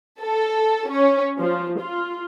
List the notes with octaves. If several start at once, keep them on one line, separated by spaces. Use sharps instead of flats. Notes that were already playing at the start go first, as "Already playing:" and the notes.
A4
C#4
F3
F4